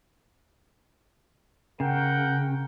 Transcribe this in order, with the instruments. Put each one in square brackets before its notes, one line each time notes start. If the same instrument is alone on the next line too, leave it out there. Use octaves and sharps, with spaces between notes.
[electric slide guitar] C#3 [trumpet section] A#4 F#5 G5